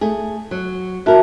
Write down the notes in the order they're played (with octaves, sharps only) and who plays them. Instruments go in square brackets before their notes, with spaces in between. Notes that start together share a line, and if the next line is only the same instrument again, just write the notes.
[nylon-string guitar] A3 G#4
F#3
[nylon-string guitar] E4 A#4 [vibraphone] F#4 E5 A5